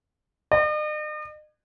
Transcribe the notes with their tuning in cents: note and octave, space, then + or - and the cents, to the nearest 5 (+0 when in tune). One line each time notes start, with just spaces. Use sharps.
D#5 -45